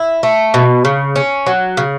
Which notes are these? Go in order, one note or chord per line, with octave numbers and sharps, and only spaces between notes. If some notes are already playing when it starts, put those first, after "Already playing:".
Already playing: E4
A3
B2
C#3
C#4
F#3
C#3